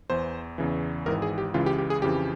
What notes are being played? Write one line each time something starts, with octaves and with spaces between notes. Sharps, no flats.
E2 E3 C5
E2 C#3 E3
G#1 G#2 E3 A#4
G#4
G4
C#2 C#3 E3 F4
G4
G4
G#4
F2 C#3 E3 G4